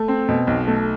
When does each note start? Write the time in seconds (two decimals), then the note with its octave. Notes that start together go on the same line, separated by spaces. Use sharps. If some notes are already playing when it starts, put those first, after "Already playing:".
Already playing: A3
0.08 C4
0.29 B2
0.47 B1
0.68 A3